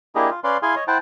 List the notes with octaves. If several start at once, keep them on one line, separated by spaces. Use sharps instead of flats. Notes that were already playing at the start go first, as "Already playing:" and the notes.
A#3 D4 E4 G4 G#4 D#5
F4
C#4 B4 D5 F5 C6
E4 G#4 F5 G#5 C6
C#5 D#5
E4 C5 F#5 G5 A5